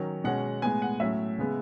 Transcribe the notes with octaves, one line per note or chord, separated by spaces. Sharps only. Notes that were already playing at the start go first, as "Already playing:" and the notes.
Already playing: D#3 F#3 C#4
B2 G#3 C#4 F#5
A2 G#3 B3 G#5
F#5
A2 F#3 C#4 E5
C#3 G#3 B3